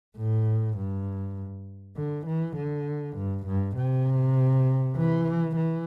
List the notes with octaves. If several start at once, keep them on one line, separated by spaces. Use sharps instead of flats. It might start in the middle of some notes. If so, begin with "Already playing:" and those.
A2
G2
D3
E3
D3
G2
G2
C3
E3
E3